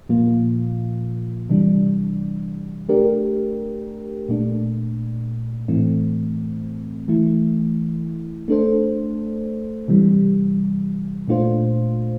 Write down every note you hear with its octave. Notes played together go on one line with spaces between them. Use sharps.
A#2 F3 A#3 F4
C3 E3 G3 D4
A3 D4 G4 A#4
A#2 A3 D4
A2 E3 A3 C4
E3 A3 E4
A3 D4 A4 C5
C3 E3 G3
A#2 A3 D4 F4 C5